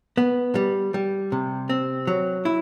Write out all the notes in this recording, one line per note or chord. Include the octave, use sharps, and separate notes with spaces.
B3
G3
G3
C3
C4
F#3
E4